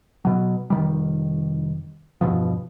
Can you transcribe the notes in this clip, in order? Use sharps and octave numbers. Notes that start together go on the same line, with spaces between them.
B2 F#3
F1 D#3 G3
E2 G2 B2 F3